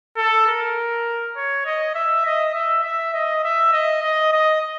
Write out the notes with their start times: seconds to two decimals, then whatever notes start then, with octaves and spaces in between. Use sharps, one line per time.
0.17 A4
0.47 A#4
1.36 C#5
1.66 D#5
1.95 E5
2.25 D#5
2.54 E5
2.84 E5
3.13 D#5
3.44 E5
3.73 D#5
4.03 D#5
4.33 D#5